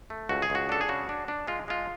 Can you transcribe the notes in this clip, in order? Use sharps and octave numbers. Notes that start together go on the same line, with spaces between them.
A3
C#2 F#4
G#4
C#2 F#4
D4 A4
G#4
C#3 F#4
D4
D4
G#3 F4
G#3 F4